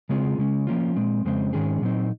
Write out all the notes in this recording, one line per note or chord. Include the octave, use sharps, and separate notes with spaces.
C#3 G#3 C4 F4 G#4
C#3 G#3 C#4
F3 A#3 C#4 F4
A#2 G#3 C4
F2 C#3 G#3 C4
G#2 D#3 G#3 C#4 G#4
A#2 F#3 C4 D#4